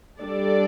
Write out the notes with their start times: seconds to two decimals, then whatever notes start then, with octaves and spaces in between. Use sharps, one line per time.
0.18 G3 D4 A4 D5